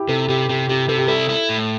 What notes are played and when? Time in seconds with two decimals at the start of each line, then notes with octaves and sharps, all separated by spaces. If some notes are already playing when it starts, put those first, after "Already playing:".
Already playing: E4 G4
0.08 C3 A4
0.29 C3 G4
0.49 C3 G4
0.68 C3 G4
0.89 C3 A4
0.98 G4
1.07 E4 A4
1.29 E4
1.49 A2